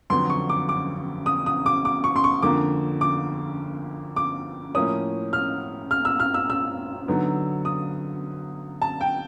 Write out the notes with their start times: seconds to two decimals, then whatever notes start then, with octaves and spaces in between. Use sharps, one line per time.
0.10 F2 D3 F#3 B3 C6
0.30 C#6
0.49 D6
0.69 D6
1.26 D#6
1.46 D#6
1.66 D6
1.85 D6
2.04 C#6
2.16 C6
2.24 C#6
2.42 F2 D3 F3 A#3 D6
3.01 D6
4.16 D6
4.75 A2 F3 A#3 C#4 D#6
5.33 F6
5.91 F6
6.05 E6
6.20 F6
6.34 E6
6.50 E6
7.08 D3 F#3 B3 D#4
7.65 D#6
8.82 A5
9.01 G5